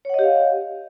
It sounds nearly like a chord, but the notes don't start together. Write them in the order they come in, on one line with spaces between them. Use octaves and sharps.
C#5 F#5 D#5 G4 F5